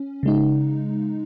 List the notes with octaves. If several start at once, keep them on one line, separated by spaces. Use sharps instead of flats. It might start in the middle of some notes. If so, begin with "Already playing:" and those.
Already playing: C#4
C#3 G#3 D#4